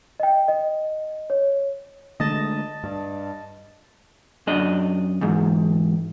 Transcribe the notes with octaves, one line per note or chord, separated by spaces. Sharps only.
D#5 G5
D#5
C#5
D3 G#3 A3 D#5 A5 A6
G2
F#2 D4 D#5
E2 G#2